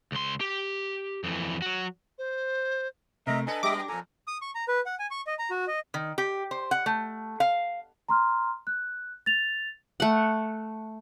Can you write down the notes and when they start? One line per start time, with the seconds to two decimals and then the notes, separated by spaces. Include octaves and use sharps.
0.12 C#2 C6
0.41 G4
1.24 F2 E3
1.62 F#3 F#4
2.18 C5
3.27 C3 A3 A#4 D#5 E5 A#5
3.47 D4 A4 B4 D#5 G#5
3.63 G3 B3 G4 D#5 E5 D6 A#6
3.76 G4
3.88 F2 A#2 A4 G#5 A#5
4.28 D#6
4.42 C#6
4.55 A#5
4.68 B4
4.86 F#5
4.99 G#5
5.11 C#6
5.27 D#5
5.39 A#5
5.51 F#4
5.68 D#5
5.94 D#3
6.18 G4
6.51 C5
6.71 F#5
6.86 A3
7.40 F5
8.09 A#5 C6 F6
8.67 F#6
9.26 A6 F7
10.00 A3 F#5